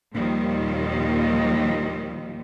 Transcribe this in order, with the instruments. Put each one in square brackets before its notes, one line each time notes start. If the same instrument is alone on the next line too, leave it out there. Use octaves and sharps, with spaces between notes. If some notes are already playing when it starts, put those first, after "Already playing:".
[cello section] D#2 A#2 D#3 F3 G3